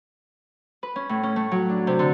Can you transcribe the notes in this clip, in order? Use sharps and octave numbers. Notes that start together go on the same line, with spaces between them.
B4
C#4
A2
C#4
A3
F#3
D4
C3
D3